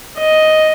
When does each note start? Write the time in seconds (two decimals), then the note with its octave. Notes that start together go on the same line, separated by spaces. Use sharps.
0.19 D#5